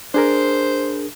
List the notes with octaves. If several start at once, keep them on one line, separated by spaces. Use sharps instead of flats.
D4 G#4 A#4 C5